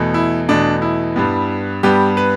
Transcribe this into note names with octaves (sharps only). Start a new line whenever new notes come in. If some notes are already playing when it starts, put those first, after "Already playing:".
Already playing: E2 B2 A3
E4
E2 B2 A3 D4
E4
G2 G3 B3
G2 G3 B3 G4
B4